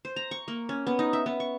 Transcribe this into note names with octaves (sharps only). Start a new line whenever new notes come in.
C5
A#5
C#6
A#3
C#4
B3
D#4
E5
B3
C#6